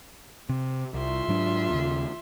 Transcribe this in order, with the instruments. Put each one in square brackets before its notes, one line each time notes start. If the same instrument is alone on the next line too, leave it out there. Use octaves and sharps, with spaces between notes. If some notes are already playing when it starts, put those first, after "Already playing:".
[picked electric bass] C3
[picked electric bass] C2 [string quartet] F4 E5 C6
[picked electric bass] G#2 F#3 D4
D#2 C#3